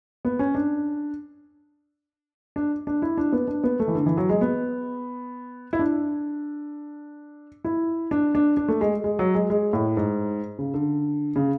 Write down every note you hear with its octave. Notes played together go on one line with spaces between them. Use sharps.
B3
C#4
D4
D4
D4
E4
D4
B3
D4
B3
A3
E3
D3
E3
F#3
G#3
B3
E4
D4
E4
D4
D4
D4
A3
G#3
G#3
F#3
G#3
G#3
A2
G#2
C#3
D3
C#3